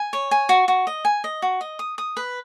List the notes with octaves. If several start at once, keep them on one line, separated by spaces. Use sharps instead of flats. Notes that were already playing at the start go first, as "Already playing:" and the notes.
Already playing: G#5
C#5
G#5
F#4
F#4
D#5
G#5
D#5
F#4
D#5
D#6
D#6
B4